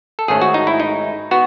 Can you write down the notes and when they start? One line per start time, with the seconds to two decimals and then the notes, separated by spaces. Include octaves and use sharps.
0.19 A4
0.28 G#1 G#2 D#3 A3 C#4 G#4
0.42 F#4
0.54 D#4
0.67 E4
0.80 D#4
1.31 B3 F#4